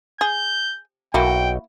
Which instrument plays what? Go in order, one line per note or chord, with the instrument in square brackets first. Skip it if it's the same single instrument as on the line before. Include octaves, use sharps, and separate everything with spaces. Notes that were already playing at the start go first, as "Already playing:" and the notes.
[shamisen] G#4 [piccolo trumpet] G6
[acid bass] B1 [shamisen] A#3 E4 [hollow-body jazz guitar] F#4 [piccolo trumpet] G5